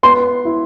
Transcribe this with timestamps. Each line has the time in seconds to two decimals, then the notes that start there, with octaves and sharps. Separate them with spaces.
0.03 B3 C6
0.45 E4